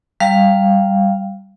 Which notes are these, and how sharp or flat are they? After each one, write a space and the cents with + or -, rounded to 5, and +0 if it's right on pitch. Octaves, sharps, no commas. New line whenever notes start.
G3 +0 F5 +0